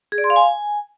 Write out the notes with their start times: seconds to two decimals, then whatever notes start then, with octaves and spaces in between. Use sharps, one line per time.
0.12 G#4
0.18 D5
0.24 C6
0.30 F5
0.36 G#5